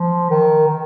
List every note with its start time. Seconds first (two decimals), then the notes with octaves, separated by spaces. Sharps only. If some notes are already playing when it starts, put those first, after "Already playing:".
Already playing: F3
0.30 D#3
0.67 D#3